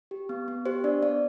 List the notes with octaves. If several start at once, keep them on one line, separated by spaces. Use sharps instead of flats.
G4
B3
B3
G4 C5
D4 D5
B3 D5